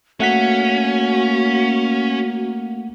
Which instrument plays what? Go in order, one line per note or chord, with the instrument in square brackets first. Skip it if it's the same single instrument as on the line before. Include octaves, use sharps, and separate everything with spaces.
[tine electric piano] A3 F#5 B6 [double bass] A#3 [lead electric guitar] C#4 [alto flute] F#4